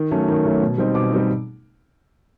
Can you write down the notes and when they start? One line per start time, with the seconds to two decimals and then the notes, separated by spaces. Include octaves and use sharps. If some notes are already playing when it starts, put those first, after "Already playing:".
Already playing: D#3
0.11 F#3 A3 C#4
0.28 D#3
0.45 F#3 A3 C#4
0.62 B2
0.78 G3 C4 D#4
0.94 B2 D6
1.12 G3 C4 D#4